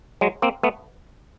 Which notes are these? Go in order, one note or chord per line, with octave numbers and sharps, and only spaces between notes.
F#3 G#3
A#3 C4
A3 B3